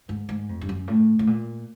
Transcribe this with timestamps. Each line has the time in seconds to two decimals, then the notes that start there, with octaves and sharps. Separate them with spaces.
0.09 G#2
0.29 G#2
0.49 F2
0.61 G2
0.69 F#2
0.88 A2
1.19 A2
1.27 A#2